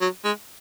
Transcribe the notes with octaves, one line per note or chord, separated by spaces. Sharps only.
F#3
G#3